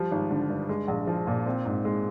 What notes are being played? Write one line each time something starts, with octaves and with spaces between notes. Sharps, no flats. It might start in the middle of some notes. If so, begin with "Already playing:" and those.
Already playing: F3 G3
G#1
D3
G2
G#3
A#1
F3
A#2
C4
G#2
G#3